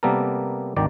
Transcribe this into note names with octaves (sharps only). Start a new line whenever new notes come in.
C3 G3 A#3 B3 A4 A#4
G#1 D2 D#3 D5 G5 A#5